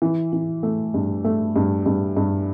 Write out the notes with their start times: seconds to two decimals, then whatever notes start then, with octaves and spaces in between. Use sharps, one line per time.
0.02 E3
0.33 E3
0.63 A3
0.94 G2
1.24 A3
1.56 G2
1.86 G2
2.17 G2